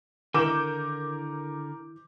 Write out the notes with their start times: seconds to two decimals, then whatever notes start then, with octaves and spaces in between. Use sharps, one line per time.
0.34 D3 D#3 E4 A#4 D6 G6 E7